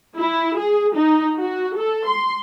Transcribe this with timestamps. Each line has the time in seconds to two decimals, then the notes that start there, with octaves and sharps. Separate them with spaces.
0.16 E4
0.56 G#4
0.94 D#4
1.39 F#4
1.77 A4
2.07 C6